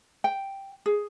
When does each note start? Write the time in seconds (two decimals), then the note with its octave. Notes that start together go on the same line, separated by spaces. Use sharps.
0.24 G5
0.86 G#4